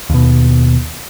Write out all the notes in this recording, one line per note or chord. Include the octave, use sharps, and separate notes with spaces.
D#2 B2